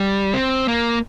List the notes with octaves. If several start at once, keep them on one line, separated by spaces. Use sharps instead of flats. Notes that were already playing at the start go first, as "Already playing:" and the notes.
Already playing: G3
C4
A#3